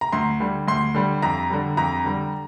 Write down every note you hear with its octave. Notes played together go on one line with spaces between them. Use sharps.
A#5
D2 C6
D3 G3
D2 C6
D3 G3
F2 A#5
D3 G3
F2 A#5
D3 G3